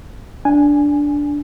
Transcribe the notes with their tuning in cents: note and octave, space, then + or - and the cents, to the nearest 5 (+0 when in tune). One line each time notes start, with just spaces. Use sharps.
D4 -10 G#5 +0